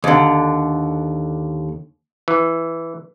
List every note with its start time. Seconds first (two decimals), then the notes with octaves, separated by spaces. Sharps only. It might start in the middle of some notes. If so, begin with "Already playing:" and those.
0.04 D#2 D3
2.28 E3